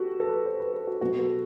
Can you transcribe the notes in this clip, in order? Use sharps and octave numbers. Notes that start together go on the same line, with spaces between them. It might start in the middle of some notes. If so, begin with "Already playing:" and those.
Already playing: F#4 G4 A4
A4
B4
C5
B4
A4
F#4
B2 F#3 B3 F#4
A4